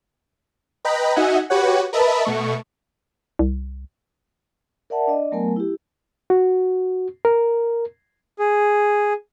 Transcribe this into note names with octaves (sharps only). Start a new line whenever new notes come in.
B4 D#5 G5 A#5 B5
D#4 F#4 D#5 E5 F#5 G#5
F#4 G4 B4 C#5 F#5
A#4 B4 D#5 E5 A5 B5
B2 A3 C#6
C2
A#4 D5 E5 F#5 A5
D4 D5 D#5
F#3 A3 B3 A#4 G#5
E4 G4
F#4
A#4
G#4